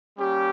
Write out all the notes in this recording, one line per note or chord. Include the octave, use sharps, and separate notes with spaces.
G3 A#3 C#4 G4